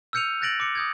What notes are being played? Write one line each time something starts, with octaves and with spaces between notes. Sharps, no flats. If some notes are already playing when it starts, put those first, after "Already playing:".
E6 F6 G6 C#7 D#7 F7
F#6 G6 A6 A#6 D7 F#7
D6 C#7
D#6 G6 G#6